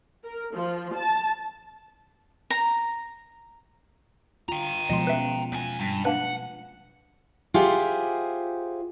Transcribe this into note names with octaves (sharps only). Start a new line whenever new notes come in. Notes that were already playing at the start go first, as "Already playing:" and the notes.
A#4
F3
A5
A#5
F4 G5 A#5
B2 F3 G#3 D#5 C6
F3 C#4 F4 B4 E5
E2 G#5
G2
A#3 D4 B4 F#5
F4 G4 G#4 C5 E5 F#5